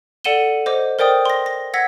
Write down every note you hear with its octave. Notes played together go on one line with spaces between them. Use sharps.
A4 D5 F#5 D#7 E7 G7
C5 D#5 D6
A#4 C5 D5 G5 D#6
C6 A#6
A#6
F#5 E6 G#6 A#6 B6